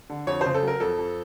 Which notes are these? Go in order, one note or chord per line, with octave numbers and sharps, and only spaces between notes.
D3
F2 C#5
C#3 C5
A4
F#3 A#4
F2 A4
F2